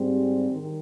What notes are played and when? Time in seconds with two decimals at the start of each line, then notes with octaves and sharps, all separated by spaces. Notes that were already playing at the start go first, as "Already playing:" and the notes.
Already playing: G#2 G3 C4
0.51 D#3